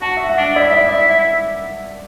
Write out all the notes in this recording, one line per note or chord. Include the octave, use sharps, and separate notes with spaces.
F#4 A5
E5
F#5
D4
E4 D5
E5
D5
E5
D5
E5